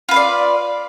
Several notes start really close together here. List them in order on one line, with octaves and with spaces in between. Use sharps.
F4 B4 F5 D5